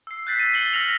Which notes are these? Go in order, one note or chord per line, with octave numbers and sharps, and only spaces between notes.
E6 C7
E6 F#6 G6 A6 B6 C7
E6 A6 B6 D#7
E6 C#7 F#7 G7
E6 F6 A#6 F7 F#7